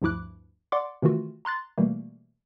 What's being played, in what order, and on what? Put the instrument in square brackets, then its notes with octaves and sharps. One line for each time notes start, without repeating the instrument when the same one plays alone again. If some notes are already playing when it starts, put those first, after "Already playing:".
[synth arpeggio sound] D2 G2 F3 E4 D6 F#6
D5 F#5 C6 D6
C3 D#3 E3 A3 F4 F#4
A#5 C6 F#6 A6
B2 E3 G3 A3 A#3